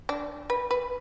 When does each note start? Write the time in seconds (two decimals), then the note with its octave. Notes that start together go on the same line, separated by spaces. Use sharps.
0.09 D4
0.50 B4
0.71 B4